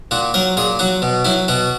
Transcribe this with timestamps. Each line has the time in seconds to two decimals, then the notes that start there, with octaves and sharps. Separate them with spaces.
0.11 A#2 F#4
0.34 F#3 A#4
0.57 A#2 G#4
0.79 F#3 F#4
1.02 B2
1.25 F#3 E4
1.48 B2 F#4